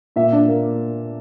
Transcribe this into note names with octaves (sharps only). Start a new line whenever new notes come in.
A#2 E5
D4
A#3